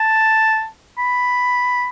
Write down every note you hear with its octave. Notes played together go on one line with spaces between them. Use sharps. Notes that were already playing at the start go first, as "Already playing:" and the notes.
Already playing: A5
B5